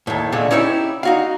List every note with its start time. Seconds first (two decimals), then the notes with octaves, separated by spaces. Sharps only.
0.07 D#2 A2
0.32 A#2 D3 G#3 A3
0.51 C#4 D#4 E4 G4 C5 C#5
1.03 D#4 F#4 F5